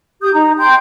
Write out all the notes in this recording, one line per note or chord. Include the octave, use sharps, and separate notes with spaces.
G4 D#6 G6
D#4 A#5
G5 C6 G6